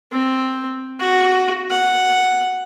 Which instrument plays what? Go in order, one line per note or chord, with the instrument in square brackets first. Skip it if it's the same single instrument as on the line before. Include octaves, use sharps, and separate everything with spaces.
[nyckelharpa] C4
F#4
F#5